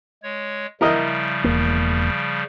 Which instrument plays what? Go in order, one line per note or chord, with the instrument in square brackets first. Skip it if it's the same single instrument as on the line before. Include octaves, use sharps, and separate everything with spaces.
[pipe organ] G#3 C#5
[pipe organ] C#3 F3 G3 [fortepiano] E4 A#4 D#5
[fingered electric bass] E1 E2 A#3